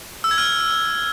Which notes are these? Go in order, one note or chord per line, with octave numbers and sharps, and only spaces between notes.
E6
G#6
F6